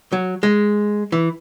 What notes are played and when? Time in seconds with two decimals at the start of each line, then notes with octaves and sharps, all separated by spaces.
0.12 F#3
0.43 G#3
1.12 E3